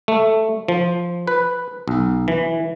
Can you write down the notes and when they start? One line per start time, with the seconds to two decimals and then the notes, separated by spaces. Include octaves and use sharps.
0.08 A3
0.68 F3
1.28 B4
1.88 B1
2.28 E3